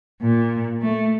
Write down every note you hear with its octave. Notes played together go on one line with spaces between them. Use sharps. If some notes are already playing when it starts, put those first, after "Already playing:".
A#2
A3